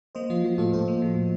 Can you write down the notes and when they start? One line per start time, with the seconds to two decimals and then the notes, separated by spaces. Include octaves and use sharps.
0.15 A#3 C5 D#5
0.30 F3 F4
0.44 F3 F#4
0.58 A2 F4 A4
0.73 A2 A4 C5
0.88 A#3
1.02 F3
1.16 A2